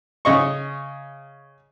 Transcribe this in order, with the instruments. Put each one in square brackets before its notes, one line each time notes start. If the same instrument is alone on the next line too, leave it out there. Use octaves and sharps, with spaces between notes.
[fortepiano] C#3 D#5 C#6